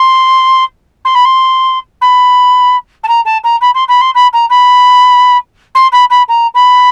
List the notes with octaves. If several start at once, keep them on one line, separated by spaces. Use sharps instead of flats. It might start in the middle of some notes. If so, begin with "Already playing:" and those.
Already playing: C6
C6
B5
C6
B5
A5
A#5
A5
A#5
B5
C6
B5
C6
B5
A#5
B5
C6
B5
B5
A#5
B5